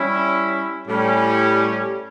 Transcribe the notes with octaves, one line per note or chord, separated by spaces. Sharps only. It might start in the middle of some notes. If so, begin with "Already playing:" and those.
Already playing: G3 C#4 E4
A2 G3 C#4